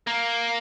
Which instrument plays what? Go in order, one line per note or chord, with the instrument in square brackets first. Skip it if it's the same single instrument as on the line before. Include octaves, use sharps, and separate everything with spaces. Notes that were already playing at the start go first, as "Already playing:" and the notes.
[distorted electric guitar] A#3